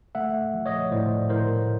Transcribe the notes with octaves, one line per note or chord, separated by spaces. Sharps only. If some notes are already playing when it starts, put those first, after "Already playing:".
A3 E5 F#5
F3
C#5 D#5
A2 C5 D5
A2 A#4 C5